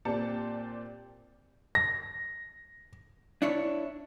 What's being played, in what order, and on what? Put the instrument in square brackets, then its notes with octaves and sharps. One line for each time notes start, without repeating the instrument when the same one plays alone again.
[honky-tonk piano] A#2 C4 G4 D5 A5 C#7
[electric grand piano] A#6
[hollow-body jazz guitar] D4 E4 C#5